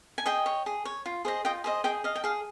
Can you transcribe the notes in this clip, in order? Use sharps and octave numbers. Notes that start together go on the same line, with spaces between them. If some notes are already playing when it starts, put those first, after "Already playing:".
G#5
G#4 D#5 G5
C#5
G#4
C#5
F4
G#4 C5 D#5
F4 D#5 G5
G#4 C5 D#5
G#4 D#5 G5
D#5 F5
G5
G#4 F5